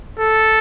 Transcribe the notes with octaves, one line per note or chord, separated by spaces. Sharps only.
A4